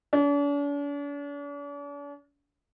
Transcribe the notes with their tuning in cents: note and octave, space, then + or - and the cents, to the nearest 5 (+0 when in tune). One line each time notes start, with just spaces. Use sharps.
D4 -45